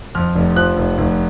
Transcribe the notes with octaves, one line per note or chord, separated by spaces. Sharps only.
F2 F6
F1
F3 F#6
F1
F1